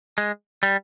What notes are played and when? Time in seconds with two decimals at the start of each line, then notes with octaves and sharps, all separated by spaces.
0.18 G#3
0.63 G3